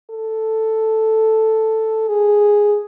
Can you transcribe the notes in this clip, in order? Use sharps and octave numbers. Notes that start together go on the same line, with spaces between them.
A4
G#4